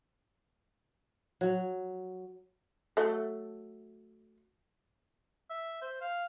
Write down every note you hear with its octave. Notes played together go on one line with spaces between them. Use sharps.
F#3
F#3 A3
E5
C5
F5